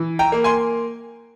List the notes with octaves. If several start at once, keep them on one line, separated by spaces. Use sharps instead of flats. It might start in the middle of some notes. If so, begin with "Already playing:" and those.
Already playing: E3
G5 A#5
A#3
G#5 C6